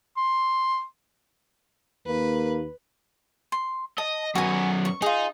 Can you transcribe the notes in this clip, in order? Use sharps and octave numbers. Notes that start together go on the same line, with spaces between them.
C6
D#2 A#3 B4
C6
D#5 A5
F#2 B3 F#4 G#5
C#6
D#4 F4 G#4